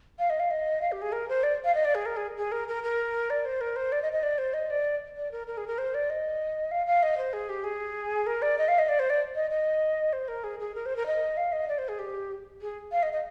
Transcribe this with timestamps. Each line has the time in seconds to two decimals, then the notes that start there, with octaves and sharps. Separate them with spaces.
0.19 F5
0.30 D#5
0.40 F5
0.51 D#5
0.81 F5
0.92 G4
1.02 G#4
1.12 A#4
1.29 C5
1.43 D5
1.64 F5
1.75 D#5
1.85 D5
1.95 G#4
2.06 A#4
2.17 G#4
2.37 G#4
2.52 A#4
2.68 A#4
2.83 A#4
3.30 D5
3.45 C5
3.61 A#4
3.76 C5
3.92 D5
4.02 D#5
4.13 D#5
4.23 D5
4.38 C5
4.54 D#5
4.70 D5
5.16 D5
5.32 A#4
5.47 A#4
5.57 G#4
5.67 A#4
5.78 C5
5.94 D5
6.10 D#5
6.71 F5
6.87 F5
7.03 D#5
7.18 C5
7.33 G#4
7.49 G4
7.64 G#4
8.27 A#4
8.42 D5
8.58 D#5
8.68 F5
8.79 D#5
8.89 D5
8.99 C5
9.10 D5
9.35 D#5
9.51 D#5
10.13 C5
10.28 A#4
10.44 G#4
10.60 G#4
10.75 A#4
10.86 C5
10.96 A#4
11.06 D#5
11.37 F5
11.52 D#5
11.68 D5
11.78 C5
11.89 G#4
11.99 G4
12.61 G#4
12.92 F5
13.03 D#5
13.13 D#5